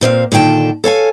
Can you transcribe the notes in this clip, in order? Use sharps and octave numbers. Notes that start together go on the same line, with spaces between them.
A#2 C4 D5 F5
A#2 D3 D#3 G5 A5
A4 C#5 F5 G#5